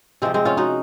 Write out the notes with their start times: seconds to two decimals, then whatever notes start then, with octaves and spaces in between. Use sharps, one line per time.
0.22 C3 F3 G#3 C4
0.34 G#3 C4
0.45 C#4 F4
0.57 D#4 F#4